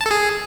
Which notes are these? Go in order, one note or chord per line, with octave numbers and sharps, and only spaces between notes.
A5
A4
G#4